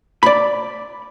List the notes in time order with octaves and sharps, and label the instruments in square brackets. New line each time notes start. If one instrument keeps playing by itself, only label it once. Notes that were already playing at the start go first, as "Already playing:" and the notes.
[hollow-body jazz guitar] D5 B5